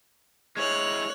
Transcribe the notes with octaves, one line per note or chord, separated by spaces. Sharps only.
G#3 E4 C#5 F6 F#6